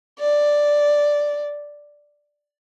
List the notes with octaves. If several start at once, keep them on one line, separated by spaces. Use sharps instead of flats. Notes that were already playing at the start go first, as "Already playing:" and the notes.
D5